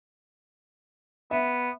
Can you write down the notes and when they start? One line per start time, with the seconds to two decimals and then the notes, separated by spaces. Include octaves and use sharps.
1.31 B3 E5